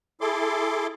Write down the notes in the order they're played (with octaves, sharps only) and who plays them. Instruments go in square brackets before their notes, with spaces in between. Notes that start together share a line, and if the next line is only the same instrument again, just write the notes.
[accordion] E4 G#4 A4 C6 D6